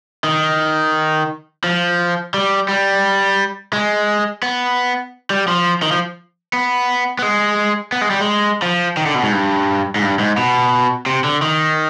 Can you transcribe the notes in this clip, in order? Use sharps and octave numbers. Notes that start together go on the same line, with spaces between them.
D#3
F3
G3
G3
G#3
B3
G3
F3
D#3
F3
B3
B3
G#3
B3
G#3
G3
G#3
F3
D#3
D3
B2
G#2
G2
G#2
G2
G#2
B2
C3
D3
D#3